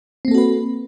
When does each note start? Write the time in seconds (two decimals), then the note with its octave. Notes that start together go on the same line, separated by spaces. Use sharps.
0.25 C4
0.28 A#3
0.31 A4
0.35 F#4
0.38 B4